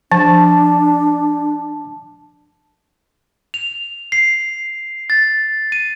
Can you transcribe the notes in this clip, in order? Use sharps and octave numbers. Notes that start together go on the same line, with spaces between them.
F3 D4 A5
F7
C7
A6
D#7